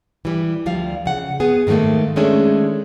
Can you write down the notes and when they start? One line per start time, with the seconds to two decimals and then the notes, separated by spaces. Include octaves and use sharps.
0.25 E3 G3
0.66 D2 F3 G3 F5
1.06 C#3 F#5
1.40 B3 G#4
1.67 G#2 D#3 F#3 A3 A#3
2.16 D#3 G#3 A3 C#4 D4